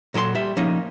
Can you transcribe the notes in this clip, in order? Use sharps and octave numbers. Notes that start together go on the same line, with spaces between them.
A#2 F#3 A4 D5 C6
G3 E5
F3 A#3 C#4 D#4